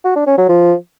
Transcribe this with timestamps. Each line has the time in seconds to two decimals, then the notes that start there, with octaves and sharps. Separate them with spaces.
0.05 F#4
0.16 D4
0.27 C#4
0.38 F#3
0.49 F3